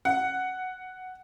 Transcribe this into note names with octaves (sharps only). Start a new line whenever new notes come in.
F#5